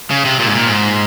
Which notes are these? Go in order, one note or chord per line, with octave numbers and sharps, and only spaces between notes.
C#3
C3
A#2
G#2
A#2
G#2